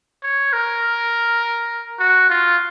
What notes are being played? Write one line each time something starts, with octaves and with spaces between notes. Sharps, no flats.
C#5
A#4
F#4
F4